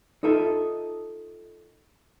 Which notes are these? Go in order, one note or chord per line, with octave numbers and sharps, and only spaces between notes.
D#4 F4 A4 D#5 E5